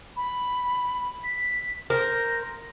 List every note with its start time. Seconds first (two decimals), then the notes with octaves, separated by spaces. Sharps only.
0.16 B5
1.24 B6
1.90 A#4 C5 A#6